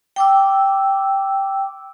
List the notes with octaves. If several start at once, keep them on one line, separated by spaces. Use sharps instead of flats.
G5 D6 E6